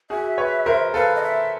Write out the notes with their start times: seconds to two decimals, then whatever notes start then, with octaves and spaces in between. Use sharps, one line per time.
0.10 F#4 G#4 E5
0.38 B4 C#5
0.66 A#4 C5
0.94 A4 B4 F5
1.16 D#5
1.23 E5